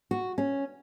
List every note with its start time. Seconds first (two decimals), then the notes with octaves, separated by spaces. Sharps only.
0.11 F#4
0.38 C#4